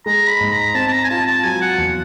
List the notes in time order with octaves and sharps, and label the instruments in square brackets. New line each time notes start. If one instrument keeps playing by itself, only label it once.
[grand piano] G#3 [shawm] A#5
[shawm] B5
[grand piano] G#2
[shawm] A#5
[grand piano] C4 [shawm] A5
[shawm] A5
A#5
G#5
[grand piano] F4 [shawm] A5
[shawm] A5
[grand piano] F#3 [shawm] G#5
[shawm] F#5
[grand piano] E2